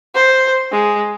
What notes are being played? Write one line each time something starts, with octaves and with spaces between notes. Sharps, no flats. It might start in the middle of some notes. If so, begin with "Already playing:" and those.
C5
G#3